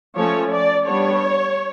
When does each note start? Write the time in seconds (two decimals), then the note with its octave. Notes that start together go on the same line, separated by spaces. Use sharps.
0.15 F3 A3 C#4 C#5
0.51 D5
0.86 G3 B3 D4 C#5